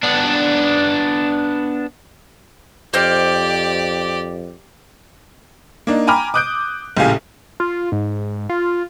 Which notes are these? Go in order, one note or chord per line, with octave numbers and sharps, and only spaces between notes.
B3 D4
F2 G4 C5 D5 D#5 F6
A#3 D4 D#4
G5 G#5 A#5 B5 D6 F6
D6 D#6 F#6 G6 D7
A#1 A2 C#3 G4 F5 G#5
F4
G#2
F4